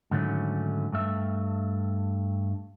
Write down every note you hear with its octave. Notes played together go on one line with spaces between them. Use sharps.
G#2 D3 D#3 F#3 A3 C#4
G2 A3 E5